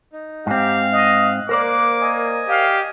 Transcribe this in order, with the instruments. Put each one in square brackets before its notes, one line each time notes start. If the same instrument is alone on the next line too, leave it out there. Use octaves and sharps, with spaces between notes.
[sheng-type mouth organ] D#4
[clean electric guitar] G#2 C4 [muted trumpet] G4 [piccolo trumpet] F5
[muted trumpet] D#5 [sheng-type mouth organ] F#6
[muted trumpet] A#3 [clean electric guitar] A#4 C5 D5 [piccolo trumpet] D6
[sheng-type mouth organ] D#5 G#5
[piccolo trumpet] G4 [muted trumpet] F5